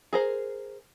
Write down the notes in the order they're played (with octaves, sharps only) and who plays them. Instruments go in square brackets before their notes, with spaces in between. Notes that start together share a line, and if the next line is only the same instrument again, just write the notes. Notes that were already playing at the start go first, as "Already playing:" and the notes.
[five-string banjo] G#4 A#4 C5